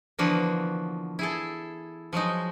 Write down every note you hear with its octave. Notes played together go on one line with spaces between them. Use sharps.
D3 E3 F3 A#3 B3 F#4
E4 G#4 A4
F3 F#3 G#3 D#4